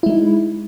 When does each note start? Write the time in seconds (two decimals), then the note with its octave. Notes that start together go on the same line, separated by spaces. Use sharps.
0.03 E4
0.06 G#3
0.10 D#4